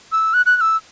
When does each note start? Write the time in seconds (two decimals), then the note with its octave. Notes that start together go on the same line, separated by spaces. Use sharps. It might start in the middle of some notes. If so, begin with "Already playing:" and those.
0.12 E6
0.34 F#6
0.46 F#6
0.57 F#6
0.61 E6